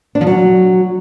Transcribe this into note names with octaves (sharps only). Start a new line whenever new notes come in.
D4
F3
F#3